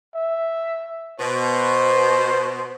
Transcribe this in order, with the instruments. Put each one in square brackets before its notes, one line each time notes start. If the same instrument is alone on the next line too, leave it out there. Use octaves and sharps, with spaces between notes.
[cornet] E5
[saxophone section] B2 [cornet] C5